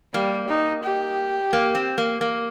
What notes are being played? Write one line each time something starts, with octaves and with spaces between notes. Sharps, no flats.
G3 A#3
D#4
G4
A#3
C4
A#3
A#3